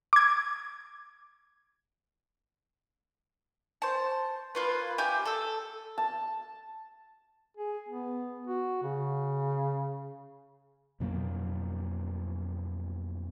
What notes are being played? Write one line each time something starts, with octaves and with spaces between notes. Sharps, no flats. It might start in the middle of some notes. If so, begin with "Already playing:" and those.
D6 G#6
C5 A5
A#3 F4 B4
G4 E5 G#5 G6
A4 E6
A5
G#4
B3
F#4
C#3
F2 B2 F#3 A#3